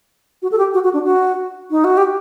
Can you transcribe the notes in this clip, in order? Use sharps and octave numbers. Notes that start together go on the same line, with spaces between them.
F#4
A4
G4
F#4
F#4
D4
F#4
D#4
F#4
G4